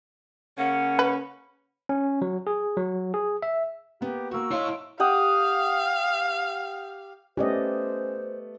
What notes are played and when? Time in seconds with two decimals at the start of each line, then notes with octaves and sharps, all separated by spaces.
0.58 C#3 A#3 C#4 F#5
0.99 B4
1.89 C#4
2.22 F#3
2.47 G#4
2.77 F#3
3.14 G#4
3.42 E5
4.01 A#3 B3 G4
4.31 A#3 F#4 C#6 E6
4.51 E4 C#5 D#5 F5 C6
5.00 G4 F5 F#5 D#6
7.37 A3 B3 C#4 G4 C5 D5 D#5